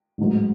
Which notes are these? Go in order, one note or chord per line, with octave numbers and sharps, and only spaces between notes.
A1 G#2 F#3